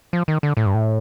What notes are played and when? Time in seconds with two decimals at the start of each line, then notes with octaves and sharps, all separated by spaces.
0.13 F3
0.28 D#3
0.43 D3
0.57 A2
0.66 G2
0.74 A2